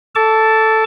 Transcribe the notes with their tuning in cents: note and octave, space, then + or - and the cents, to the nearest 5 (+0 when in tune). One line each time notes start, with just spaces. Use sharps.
A4 +0 A5 +0 D6 -40